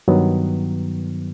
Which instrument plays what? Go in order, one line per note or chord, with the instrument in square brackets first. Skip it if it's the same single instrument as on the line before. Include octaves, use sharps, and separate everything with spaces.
[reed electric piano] G2 D#3 F#3 B3